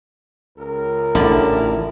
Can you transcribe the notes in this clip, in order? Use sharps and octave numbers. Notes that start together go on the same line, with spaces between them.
C#2 A#4
A1 D3 E4 A4 D5 B5